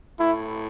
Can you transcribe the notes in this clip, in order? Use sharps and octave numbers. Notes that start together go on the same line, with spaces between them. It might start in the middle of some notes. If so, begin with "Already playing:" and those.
A2 E4